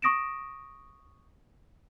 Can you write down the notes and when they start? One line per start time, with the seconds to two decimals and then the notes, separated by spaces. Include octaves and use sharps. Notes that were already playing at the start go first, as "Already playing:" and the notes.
0.02 C#6 D#6 A#6 D7 E7